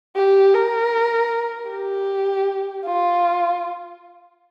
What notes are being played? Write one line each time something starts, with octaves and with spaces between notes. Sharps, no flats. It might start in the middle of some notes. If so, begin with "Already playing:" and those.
G4
A#4
G4
F4